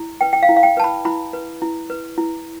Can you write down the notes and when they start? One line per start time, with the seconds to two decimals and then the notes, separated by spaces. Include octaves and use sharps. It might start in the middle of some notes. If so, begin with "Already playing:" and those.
Already playing: E4
0.21 B4 G5
0.33 G5
0.43 F5
0.49 E4
0.57 F5
0.63 G5
0.77 B4 A5
0.84 B5
1.05 E4 B5
1.33 B4
1.62 E4
1.90 B4
2.18 E4